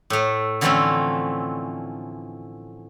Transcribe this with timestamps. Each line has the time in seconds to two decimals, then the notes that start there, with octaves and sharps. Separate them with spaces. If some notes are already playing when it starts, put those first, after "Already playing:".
0.10 A2 A3
0.61 D3 E3 F3 A3 C4 C#4